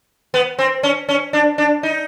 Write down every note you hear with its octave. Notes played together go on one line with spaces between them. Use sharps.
B3
C4
C#4
C#4
D4
D4
D#4